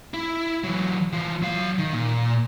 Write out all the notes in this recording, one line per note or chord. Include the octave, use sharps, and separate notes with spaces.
E4
E3 F#3
E3 F4
F#3 F5
D#3
A#2